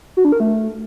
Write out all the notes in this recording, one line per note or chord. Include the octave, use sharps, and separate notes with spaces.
F#4
D4
A#4
A3